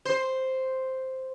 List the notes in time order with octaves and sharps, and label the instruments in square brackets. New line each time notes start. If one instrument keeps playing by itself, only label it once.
[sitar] C5